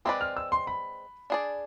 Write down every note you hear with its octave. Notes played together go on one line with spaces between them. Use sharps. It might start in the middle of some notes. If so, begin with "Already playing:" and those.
G#3 C4 E4 B4 D5 D6
F6
E6
C6
B5
D4 G#4 D5